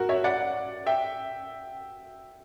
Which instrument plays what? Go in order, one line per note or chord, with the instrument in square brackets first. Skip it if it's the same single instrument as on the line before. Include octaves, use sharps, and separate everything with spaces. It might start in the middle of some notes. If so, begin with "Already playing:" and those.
Already playing: [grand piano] F#4 A#4
C#5 E5
D5 F#5
E5 G5